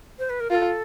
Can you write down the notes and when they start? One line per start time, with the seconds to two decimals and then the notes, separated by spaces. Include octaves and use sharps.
0.19 C5
0.30 B4
0.40 A#4
0.50 F4 A#4
0.55 A4